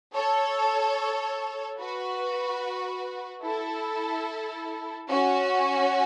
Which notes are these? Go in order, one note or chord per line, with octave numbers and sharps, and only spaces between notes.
A4 C#5
F#4 B4
E4 A4
C#4 F#4